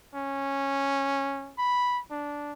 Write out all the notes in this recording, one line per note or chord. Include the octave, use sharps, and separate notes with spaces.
C#4
B5
D4